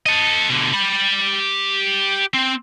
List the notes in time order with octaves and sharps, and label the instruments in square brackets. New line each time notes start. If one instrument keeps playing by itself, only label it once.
[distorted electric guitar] A4 D#5
B2 D3
G4 B5
C4